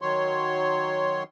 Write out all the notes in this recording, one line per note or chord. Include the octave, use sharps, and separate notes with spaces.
D#3 F#3 C#5 C6